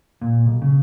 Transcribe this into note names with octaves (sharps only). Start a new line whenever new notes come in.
A#2
B1
C#3